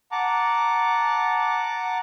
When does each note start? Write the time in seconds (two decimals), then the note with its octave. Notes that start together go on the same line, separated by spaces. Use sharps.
0.12 F#5 A5 A#5 D6